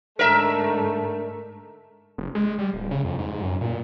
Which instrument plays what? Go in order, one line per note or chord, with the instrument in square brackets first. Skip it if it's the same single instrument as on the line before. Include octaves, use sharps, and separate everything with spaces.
[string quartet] G#2 D3 A3 [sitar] A#4 E5
[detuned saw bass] F#1
G#3
G3
D1
C#3
F2
G#2
F#2
A#2